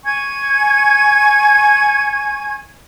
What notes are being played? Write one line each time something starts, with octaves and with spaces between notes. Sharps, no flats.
G#5 C#6 G#6